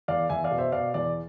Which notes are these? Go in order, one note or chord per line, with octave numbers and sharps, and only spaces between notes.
E2 D5 F5
E2 E5 G#5
D5 F5
B2
C5 E5
B2 D5 F5
E2 D5